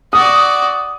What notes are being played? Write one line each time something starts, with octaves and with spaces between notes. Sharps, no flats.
F#4 D5 D#6